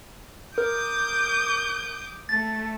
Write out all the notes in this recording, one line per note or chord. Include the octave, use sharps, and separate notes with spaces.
A#4 D6 D#6 G6
A3 A6